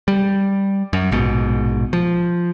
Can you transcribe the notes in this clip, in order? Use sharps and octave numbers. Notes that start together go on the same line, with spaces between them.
G3
F#2
A#1 G#2 B2
F3